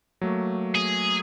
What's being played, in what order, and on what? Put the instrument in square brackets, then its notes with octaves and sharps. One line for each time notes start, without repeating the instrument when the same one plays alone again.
[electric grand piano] F#3 A3 A#3
[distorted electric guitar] G#4